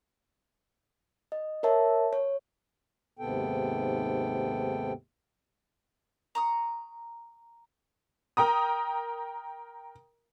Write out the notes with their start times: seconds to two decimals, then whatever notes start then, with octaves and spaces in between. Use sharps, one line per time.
1.32 D#5
1.63 A#4 C#5 E5 A5
2.13 C#5
3.19 D#2 G#2 C3 B3 A4 G5
6.35 A#5 C#6 D#6
8.37 A#4 G5 A#5 D#6